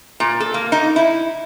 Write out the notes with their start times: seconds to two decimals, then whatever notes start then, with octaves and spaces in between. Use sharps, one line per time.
0.20 A#2
0.40 A4
0.54 A#3
0.72 D#4
0.96 E4